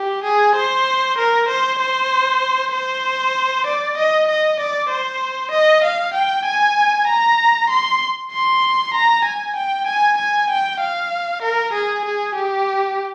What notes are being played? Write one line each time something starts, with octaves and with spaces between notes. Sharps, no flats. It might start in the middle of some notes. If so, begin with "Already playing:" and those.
Already playing: G4
G#4
C5
A#4
C5
C5
C5
D5
D#5
D#5
D5
C5
D#5
F5
G5
G#5
A#5
C6
C6
A#5
G#5
G5
G#5
G#5
G5
F5
A#4
G#4
G#4
G4